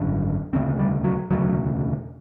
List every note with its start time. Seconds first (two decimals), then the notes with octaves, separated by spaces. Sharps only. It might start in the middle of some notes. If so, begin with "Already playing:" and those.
Already playing: G#1 F#2 D3
0.53 E1 D2 C#3 C4
0.79 G3
1.04 F#3
1.30 E1 D2 C#3 F#3